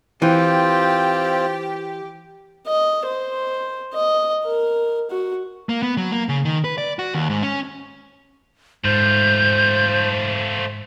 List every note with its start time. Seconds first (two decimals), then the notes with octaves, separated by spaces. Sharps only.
0.22 E3 C4 F4 G4 G5
2.67 D#5
3.06 C5
3.93 D#5
4.45 A#4
5.10 F#4
5.69 A#3
5.83 B3
5.97 F#3
6.12 A#3
6.29 C#3
6.45 D#3
6.64 B4
6.78 D5
6.99 F#4
7.14 D#2
7.30 G#2
7.43 C#4
8.84 G#2 A3 F4 C5 G6